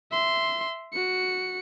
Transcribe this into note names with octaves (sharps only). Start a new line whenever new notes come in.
E5 C6
F#4 C#7